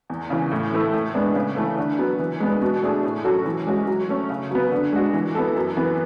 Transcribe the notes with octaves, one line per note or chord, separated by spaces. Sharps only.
E2
C#3 E3
A2
E3 A3 E4 A4
A2
G#3 B3 D4
C#3
E3 A3
D3
F#3 B3
E3
G#3 B3 D4
B2
A3 D4 G#4
A2
F#3 C#4 F#4 A4
E3
G#3 C#4 F#4
F#3
A3 C#4
C#3
F#3 B3
D3
G#3 D4 F#4
E3
B3 E4 A4
F#2
E3 B3